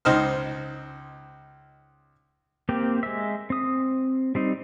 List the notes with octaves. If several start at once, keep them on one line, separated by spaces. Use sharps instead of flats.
C#2 D#4 C5 F6
A#3 C4 G4
G#3 E5
C4 D#6
G3 C4 D#4